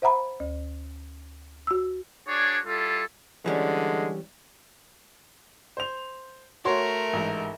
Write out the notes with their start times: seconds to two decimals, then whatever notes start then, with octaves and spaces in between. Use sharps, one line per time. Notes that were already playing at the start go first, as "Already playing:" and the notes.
0.02 C5 E5 F#5 A#5 B5
0.40 D2
1.67 F#4 E6
2.28 D4 F#4 G#4 C#5 D5
2.66 G3 E4 F4 A4
3.46 D3 E3 G3 G#3 C#4
5.77 C5 F7
6.65 A3 F#4 A#4 C#5 C6
7.13 A1 G#2